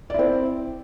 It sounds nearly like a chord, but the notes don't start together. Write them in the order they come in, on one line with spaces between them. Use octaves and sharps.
D5 E4 C4